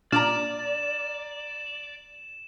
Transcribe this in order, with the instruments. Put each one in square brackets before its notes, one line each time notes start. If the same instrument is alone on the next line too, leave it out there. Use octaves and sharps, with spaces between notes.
[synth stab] A#2 D4 [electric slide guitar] D5 [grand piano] A#5 D6 F6 [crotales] E7